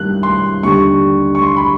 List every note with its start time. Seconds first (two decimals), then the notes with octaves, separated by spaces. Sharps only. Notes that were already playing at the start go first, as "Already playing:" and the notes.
Already playing: G2 D#3 G3 A#3 F#6
0.23 C6
0.63 D#2 D3 G3 C#6
1.35 C#6
1.42 C6
1.57 B5